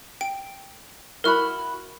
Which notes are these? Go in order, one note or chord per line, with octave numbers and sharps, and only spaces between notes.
G5 D7
E4 F#4 A#4 B5 F6